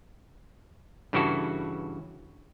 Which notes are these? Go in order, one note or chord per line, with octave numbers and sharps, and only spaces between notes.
G2 C#3 E3 E4 F#4 A4